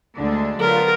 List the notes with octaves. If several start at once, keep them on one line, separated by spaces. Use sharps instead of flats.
D2 D3 G#3 D4
D3 F#3 B3 F4 A#4